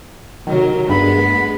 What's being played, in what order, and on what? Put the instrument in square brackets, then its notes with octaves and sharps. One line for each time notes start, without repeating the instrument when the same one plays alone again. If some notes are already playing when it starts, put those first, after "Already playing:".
[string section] C3 F#3 A#4 [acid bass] D#3
[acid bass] G2 [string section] G#3 A3 B3 [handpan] D4 F#4 A#4 [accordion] B5